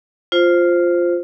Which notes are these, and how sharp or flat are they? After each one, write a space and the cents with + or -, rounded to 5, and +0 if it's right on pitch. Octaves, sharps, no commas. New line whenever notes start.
F4 +0 C5 +0